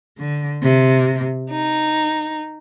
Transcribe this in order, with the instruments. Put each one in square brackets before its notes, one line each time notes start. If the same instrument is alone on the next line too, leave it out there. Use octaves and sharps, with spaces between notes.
[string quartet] D3
C3
D#4